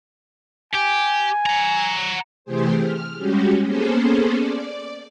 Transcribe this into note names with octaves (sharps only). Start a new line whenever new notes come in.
G4 G#5
F#5 A#5
C3 E3 A3 G4 G#4 C5
F6
G3 G#3 C#4 F#4 G4
A#3 B3 C#4 G#4 A4 C5
D5